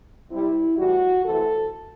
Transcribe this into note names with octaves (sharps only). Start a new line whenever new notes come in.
C3 G3 E4
A2 E3 G3 F#4
C3 E3 A3 A4